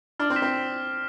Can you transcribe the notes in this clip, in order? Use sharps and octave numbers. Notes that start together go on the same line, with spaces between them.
D4 F6
C4
B6 E7
C4